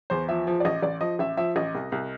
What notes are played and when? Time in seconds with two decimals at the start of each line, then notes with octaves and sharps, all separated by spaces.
0.10 E2 C5
0.29 F3 E5
0.47 F3
0.60 D5
0.65 A1 D#5
0.82 A1 D5
1.01 F3 D#5
1.19 A1 E5
1.37 F3 E5
1.56 A1 D#5
1.75 C2
1.92 C2